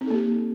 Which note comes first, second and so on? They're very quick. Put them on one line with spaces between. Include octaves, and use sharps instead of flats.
C4 D#4 A4 A#3 G4